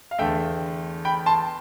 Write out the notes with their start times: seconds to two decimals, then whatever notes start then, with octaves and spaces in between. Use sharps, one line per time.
0.11 F5
0.19 E2 D3 A3 E5 G5
1.05 G5 B5
1.26 A5 C6